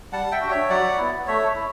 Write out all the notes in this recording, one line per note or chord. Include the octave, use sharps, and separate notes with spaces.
G3 F#5 A5
E5 G5
D4 F#4
C#5 E5
F#3 D5 F#5
B3 E4
A3 C#5 E5
E4